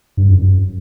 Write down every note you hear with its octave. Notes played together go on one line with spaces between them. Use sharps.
G2
F#2
F#2